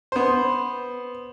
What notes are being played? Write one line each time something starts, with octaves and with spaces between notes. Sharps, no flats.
B3 C5